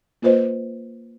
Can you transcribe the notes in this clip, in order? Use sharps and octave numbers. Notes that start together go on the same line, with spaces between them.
A#3 F4 B4 C5 D#5